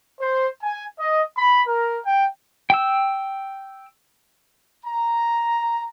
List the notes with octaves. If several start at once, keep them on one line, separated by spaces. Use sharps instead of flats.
C5
G#5
D#5
B5
A#4
G5
G5 E6
A#5